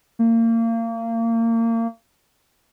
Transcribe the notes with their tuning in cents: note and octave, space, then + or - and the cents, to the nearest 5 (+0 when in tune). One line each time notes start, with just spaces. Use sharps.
A#3 -30